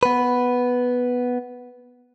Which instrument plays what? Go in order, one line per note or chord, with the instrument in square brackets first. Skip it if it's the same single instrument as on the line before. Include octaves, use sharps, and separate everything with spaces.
[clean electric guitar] B3 B4